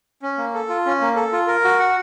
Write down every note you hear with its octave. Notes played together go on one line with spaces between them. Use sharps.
C#4
A#3
A4
F4
C#4
A#3
A4
F4
A#4
F#4
F#5